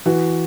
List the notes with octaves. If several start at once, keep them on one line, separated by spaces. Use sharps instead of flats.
E3 F#4